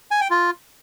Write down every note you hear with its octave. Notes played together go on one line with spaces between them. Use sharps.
G#5
G5
F4